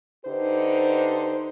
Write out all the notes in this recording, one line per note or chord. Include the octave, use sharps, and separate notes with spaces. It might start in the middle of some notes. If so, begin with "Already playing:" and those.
D3 D#4 G4 B4 C5